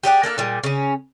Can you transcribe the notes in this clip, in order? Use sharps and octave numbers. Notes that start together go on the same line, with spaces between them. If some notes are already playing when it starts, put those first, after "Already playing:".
G4 G#4 D5 F#5
A#3 D4 A4 F5
A#2 G3 G#3
C#3 C#4